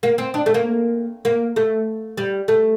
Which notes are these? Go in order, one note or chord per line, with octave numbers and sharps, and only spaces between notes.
A#3
C4
D4
A3
A#3
A#3
A3
G3
A3